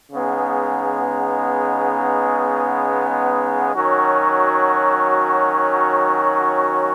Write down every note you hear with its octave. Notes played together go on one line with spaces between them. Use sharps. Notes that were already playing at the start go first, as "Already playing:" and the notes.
C#3 G#3 B3 D#4
D#3 F#3 C#4 F#4